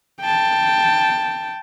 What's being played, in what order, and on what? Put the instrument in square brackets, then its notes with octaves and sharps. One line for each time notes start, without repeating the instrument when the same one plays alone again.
[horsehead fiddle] G5 A5